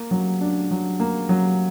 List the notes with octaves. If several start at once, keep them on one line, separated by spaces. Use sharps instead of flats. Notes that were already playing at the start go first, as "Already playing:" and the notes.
Already playing: A#3
F#3
D4
F#3
A#3
F#3